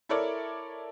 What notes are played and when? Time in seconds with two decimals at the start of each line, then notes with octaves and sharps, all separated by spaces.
0.09 E4 A4 A#4 C#5 D5 E5